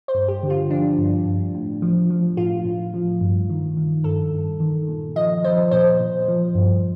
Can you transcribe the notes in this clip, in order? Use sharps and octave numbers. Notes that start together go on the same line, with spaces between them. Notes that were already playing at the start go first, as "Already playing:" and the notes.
C5
G2
G4
D3
F4
F3 D4
G2
G2
A2
F3
F3
A2 F4
A2
F3
G2
D#3
D#3
G2 A4
G2
D#3
A#2
F3 D#5
F3 C5
A#2 C5
A#2
F3
G2